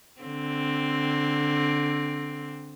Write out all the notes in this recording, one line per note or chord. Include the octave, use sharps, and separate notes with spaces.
D3 C4